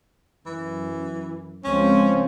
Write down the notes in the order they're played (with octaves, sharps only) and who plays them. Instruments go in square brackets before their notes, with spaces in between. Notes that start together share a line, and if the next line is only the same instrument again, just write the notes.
[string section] F#2 [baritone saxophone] E3
[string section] C#2 C4 [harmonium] F3 C#5 [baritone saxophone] C#4